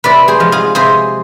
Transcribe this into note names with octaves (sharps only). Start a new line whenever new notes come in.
C3 B4 D5
G#4 C5
F3 G#3
F4 G#4
C3 G#4 C5